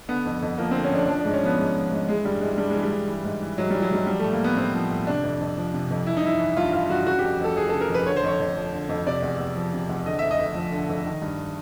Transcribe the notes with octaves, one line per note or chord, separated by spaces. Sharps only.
D3 B3
F2
F2
F3 A#3
D3 C4
C#4
F2 D4
F3 D4
G#2 D4
C#4
F3 B3
G#2
F3
G#2
E3 G#3
G2 G3
E3 G#3
G2 G3
E3 G#3
G3
G2
E3
G#2
E3
G#2 F#3
E3 G3
F#3
G#2 G3
F3 G3
A2 A3
A#3
F3 B3
A2 C4
F3
A2
C3 D4
F2
F2
F3
C3
F2
E3 E4
D#4
G2 E4
E3
G2 F4
E3 F4
G2 F#4
C#3 F#4
G4
F2
F2 A4
F3 G#4
C#3 A4
A#4
F2 B4
D3 C#5
C5
F2 C#5
F2
F3
D3
F2
C3 D5
E2
E2
F3
C3
E2
D3 D#5
F2 E5
D#5
F2
F3
D3
F2
D#3
G2